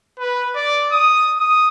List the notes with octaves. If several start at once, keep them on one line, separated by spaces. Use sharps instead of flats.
B4
D5
D#6
D#6